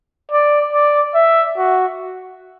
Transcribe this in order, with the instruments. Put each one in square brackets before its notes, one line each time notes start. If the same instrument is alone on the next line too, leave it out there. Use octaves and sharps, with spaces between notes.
[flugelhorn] D5
D5
E5
F#4